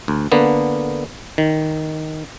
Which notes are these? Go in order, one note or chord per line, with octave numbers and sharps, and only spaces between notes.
D2
D3 A#3 B3
D#3